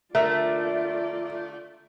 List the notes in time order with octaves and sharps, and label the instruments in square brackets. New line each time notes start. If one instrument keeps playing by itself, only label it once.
[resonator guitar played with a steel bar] D3 A3 [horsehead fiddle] F4 D5 [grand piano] A#4 E5